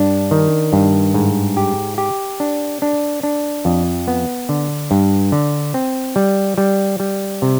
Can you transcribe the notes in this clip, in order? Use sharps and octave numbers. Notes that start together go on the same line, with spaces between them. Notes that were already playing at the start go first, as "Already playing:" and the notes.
Already playing: G2 D4
D#3
G2
G#2
G4
G4
D4
D4
D4
F2
B3
D3
G2
D3
C4
G3
G3
G3
C3